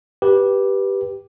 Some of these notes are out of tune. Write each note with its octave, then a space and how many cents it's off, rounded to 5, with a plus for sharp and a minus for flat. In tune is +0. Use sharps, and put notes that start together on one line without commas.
G4 +0 B4 -15